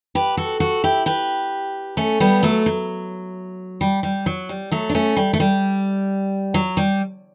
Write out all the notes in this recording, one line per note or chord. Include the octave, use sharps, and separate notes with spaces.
G4 B4
F#4 A4
F#4 A4
E4 G4
G4 B4
A3 C#4
G3 B3
F#3 A3
F#3
G3
G3
F#3
G3
F#3 A3
D4
A3 C#4
G3
A3
G3
F#3
G3